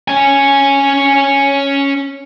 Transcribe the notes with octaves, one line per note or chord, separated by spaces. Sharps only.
C#4 G#5